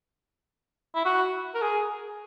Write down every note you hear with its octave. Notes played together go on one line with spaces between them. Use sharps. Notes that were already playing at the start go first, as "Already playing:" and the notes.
E4
F#4
A#4
G#4